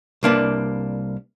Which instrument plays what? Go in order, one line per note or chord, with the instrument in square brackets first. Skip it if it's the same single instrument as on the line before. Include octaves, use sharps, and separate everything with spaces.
[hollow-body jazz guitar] C2 A#3 D4 B4